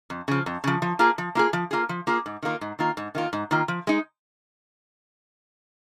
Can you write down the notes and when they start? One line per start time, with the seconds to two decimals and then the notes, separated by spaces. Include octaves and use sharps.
0.10 F2
0.28 C#3 F3
0.46 F2
0.64 C#3 F3
0.82 F3
0.99 A#3 F4 G#4
1.18 F3
1.35 A#3 F4 G#4
1.53 F3
1.71 A#3 F4 G#4
1.89 F3
2.07 A#3 F4 G#4
2.26 G#2
2.42 D#3 A#3 F4
2.61 G#2
2.79 D#3 A#3 F4
2.97 G#2
3.15 D#3 A#3 F4
3.33 G#2
3.51 D#3 A#3 F4
3.68 F3
3.87 G#3 D#4